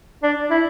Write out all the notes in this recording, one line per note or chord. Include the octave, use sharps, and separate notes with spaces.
D4
E4